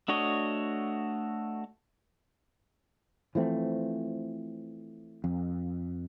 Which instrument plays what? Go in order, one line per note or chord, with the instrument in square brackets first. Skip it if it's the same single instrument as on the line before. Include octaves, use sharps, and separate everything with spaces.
[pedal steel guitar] A3 D4 F#4 C#5 D#5
[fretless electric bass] E3 F3 A3 C4
F2